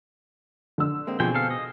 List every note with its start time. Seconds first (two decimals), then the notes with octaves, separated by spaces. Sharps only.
0.78 D3 E6
1.07 G#3 A#3 C4
1.20 B2 F3 C4 G#4 G5
1.35 A4 F5
1.50 D#5